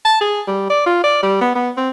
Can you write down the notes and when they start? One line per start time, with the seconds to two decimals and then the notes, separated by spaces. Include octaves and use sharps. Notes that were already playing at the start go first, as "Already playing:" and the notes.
0.05 A5
0.21 G#4
0.47 G3
0.70 D5
0.86 F4
1.04 D5
1.23 G3
1.41 B3
1.55 B3
1.77 C4